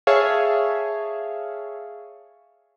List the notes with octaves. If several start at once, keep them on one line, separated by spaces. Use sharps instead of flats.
G#4 C#5 E5 F5 A5